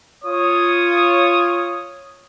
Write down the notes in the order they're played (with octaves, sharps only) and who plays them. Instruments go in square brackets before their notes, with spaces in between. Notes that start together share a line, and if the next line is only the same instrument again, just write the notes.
[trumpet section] F4 C#5 D#6